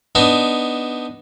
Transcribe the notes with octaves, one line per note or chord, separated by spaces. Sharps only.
B3 D4 D#4